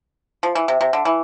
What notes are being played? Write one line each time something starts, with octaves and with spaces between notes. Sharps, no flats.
F3
E3
C3
C3
D3
E3